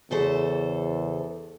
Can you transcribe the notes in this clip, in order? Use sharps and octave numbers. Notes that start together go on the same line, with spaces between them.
E2 C#3 A4 C5